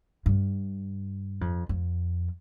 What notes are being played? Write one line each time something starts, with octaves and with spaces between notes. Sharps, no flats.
G2
F2
F2